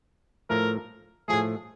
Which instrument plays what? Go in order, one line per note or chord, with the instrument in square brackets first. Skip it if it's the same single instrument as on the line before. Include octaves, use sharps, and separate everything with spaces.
[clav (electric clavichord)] A2 F3 A3 [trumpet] A#4
[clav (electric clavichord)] A2 F3 A3 [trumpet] G#4